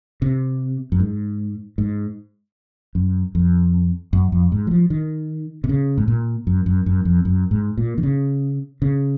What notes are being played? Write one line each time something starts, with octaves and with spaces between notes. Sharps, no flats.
C3
F#2
G#2
G#2
F#2
F2
F#2
F2
G#2
F#3
F3
D#3
C3
C#3
G#2
A#2
F#2
F#2
F#2
F2
F#2
G#2
A#2
D#3
C#3
C#3